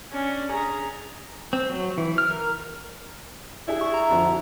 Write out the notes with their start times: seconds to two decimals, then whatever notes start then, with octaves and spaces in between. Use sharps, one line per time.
0.12 C#4 D4
0.51 G#4 A#5
1.53 C4
1.70 F#3
1.98 E3
2.18 F6
2.31 A#4
3.68 D4 E4 G4 G#4
3.81 C#6
3.94 A#5
4.10 F2 D3 F3
4.26 F#4